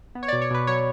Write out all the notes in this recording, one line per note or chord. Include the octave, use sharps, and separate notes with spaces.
B3
C#5
D5
B2
C#5
B2 B4
F#3 C#5